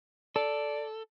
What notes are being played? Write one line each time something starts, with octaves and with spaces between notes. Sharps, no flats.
A4 D5